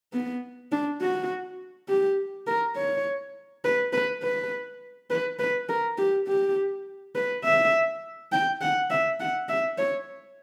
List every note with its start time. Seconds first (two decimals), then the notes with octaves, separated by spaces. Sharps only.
0.13 B3
0.72 D4
1.01 F#4
1.88 G4
2.47 A#4
2.76 C#5
3.64 B4
3.93 B4
4.22 B4
5.10 B4
5.39 B4
5.68 A#4
5.98 G4
6.27 G4
7.15 B4
7.44 E5
8.32 G5
8.61 F#5
8.90 E5
9.20 F#5
9.49 E5
9.78 C#5